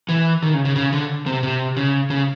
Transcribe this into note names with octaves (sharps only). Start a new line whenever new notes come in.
E3
D#3
C#3
C#3
C#3
D3
C3
C3
C#3
C#3